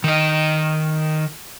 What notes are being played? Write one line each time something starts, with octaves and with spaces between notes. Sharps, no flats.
D#3 D#5